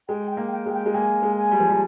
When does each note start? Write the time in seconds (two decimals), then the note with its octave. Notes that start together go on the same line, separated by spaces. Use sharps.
0.09 G#3 G5
0.31 G5
0.37 A#3
0.52 G5
0.66 G#3
0.73 G5
0.86 G#3
0.94 A#3 G#5
1.23 G#3
1.36 G#5
1.51 G3
1.60 F3
1.69 G3